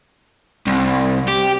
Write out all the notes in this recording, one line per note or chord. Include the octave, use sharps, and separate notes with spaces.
C2
G4